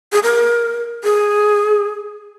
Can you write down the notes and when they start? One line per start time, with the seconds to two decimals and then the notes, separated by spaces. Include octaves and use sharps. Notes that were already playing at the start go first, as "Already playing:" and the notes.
0.12 G#4
0.23 A#4
1.04 G#4